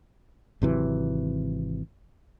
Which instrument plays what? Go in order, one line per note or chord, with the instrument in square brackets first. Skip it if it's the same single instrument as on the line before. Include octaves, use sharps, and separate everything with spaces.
[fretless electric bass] G#1 C3 E3 F#3